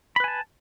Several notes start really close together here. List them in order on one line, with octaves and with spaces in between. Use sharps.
B5 B4 G#5 A5